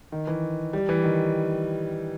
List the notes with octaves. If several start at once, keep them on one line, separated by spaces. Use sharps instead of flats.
D#3
E3
G3
E3
D#3